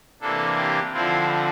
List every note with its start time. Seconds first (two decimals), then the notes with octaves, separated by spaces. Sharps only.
0.21 C3 E3 A#3 D4 A4
0.57 G4
0.93 D3 F3 C4 E4 F4